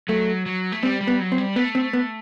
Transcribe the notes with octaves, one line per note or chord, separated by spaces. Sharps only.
F#3 A3
F#3
A3
G3 C4
G3
B3
F#3
C4
G3
A3 B3
C4
B3